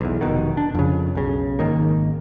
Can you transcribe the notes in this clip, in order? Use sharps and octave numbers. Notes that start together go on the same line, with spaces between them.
B1 E2
F1 C2 B2 D#3
D4
F2 C#3
B1 C#3
G#1 D#3 A#3